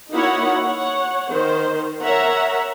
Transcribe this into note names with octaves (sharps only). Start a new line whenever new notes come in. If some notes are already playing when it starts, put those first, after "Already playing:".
A#3 D#4 E4 F#4 C#5 F#5
C#5 F#5
D#3 C5
A#4 C#5 E5 F#5 A#5